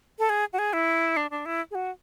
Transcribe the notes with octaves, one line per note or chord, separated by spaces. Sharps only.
A4
G#4
F#4
G#4
E4
D4
D4
E4
G#4
F#4